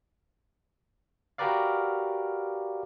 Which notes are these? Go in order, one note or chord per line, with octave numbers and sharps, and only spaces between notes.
F#4 G4 A#4 B4 D5 F5